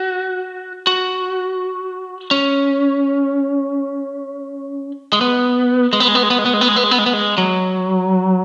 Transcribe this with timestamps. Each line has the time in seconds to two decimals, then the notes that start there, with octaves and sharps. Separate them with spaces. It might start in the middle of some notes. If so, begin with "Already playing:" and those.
Already playing: F#4
0.87 F#4
2.31 C#4
5.13 G#3
5.21 B3
5.93 G#3
6.00 B3
6.08 G#3
6.15 B3
6.23 G#3
6.30 B3
6.38 G#3
6.46 B3
6.54 G#3
6.61 B3
6.68 G#3
6.76 B3
6.84 G#3
6.91 B3
6.98 G#3
7.06 B3
7.13 G#3
7.38 F#3